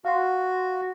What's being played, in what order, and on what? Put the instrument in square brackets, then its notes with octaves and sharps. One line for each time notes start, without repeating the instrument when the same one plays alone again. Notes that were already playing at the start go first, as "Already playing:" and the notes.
[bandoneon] F#4 [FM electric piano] F5 F#5 C6